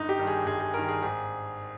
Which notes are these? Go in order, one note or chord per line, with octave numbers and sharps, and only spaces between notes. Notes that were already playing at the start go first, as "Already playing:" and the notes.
Already playing: G1 D#4
G4
G2 D#3
G#4
G1 G#4
G#4
G2 D#3 A#4
G#4
G#1 G#4